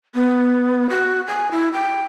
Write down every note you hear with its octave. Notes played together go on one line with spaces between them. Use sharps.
B3
F#4
G#5
E4
G5